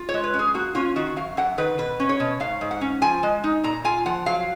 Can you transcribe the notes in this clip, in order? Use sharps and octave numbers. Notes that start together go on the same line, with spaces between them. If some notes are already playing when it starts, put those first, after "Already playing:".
Already playing: F4
C#5
G#3
B4
C#4
G#4
A#3 F#4
C#4 F4
D#3 F#4
F#2 F5
F#2 F#5
D#3 B4
B2 B4
C#4
C#5
B2
G#2 F5
G#2
F#5
C#4
F3 G#5
G#3
D#4
A#2 A#5
F4 G#5
F3 F#5
F#3 F5